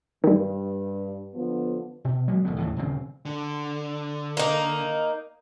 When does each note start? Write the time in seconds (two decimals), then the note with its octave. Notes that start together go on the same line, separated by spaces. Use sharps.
0.24 G2 D#3 G3
1.34 D3 F3 B3
2.05 B2
2.27 F#3 G#3 A#3 B3
2.45 D#1 A1 D3 B3
2.58 D#2 A2 C#3 E3
2.76 D#1 D2 C#3 C4
3.25 D3
4.37 A#3 D#4